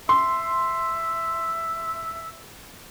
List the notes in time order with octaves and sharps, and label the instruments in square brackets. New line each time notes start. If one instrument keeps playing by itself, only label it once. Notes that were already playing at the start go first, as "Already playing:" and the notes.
[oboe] E5 [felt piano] C6